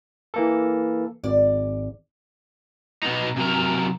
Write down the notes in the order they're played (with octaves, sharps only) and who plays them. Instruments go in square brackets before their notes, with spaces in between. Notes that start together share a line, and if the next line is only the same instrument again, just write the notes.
[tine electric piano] E3 A#3 A4
[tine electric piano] G#1 [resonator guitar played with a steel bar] D5
[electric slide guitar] B2 B3 D#4
C3 F#3 A#4